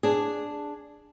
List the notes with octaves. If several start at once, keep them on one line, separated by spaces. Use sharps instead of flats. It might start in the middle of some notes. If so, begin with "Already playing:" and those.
D4 G#4